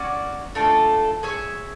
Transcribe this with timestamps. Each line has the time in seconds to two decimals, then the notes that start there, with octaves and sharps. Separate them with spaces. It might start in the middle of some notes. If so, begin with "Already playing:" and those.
Already playing: C#4 F#4 D5
0.55 A3 D4 F4 A4
1.23 G#4 C#5 E5 G#5